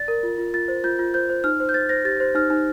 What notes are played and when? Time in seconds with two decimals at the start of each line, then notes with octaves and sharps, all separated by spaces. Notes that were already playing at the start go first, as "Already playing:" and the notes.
Already playing: D5 A6
0.08 A#4
0.23 F4
0.38 F4
0.54 F4 A6
0.68 C5
0.84 F4 G6
0.99 F4
1.14 C5 G6
1.30 C5
1.44 D#4 F6
1.60 C5
1.69 G6
1.74 C5 A6
1.89 C5 A#6
2.05 G4 A6
2.20 C5
2.35 D#4 F6
2.50 D#4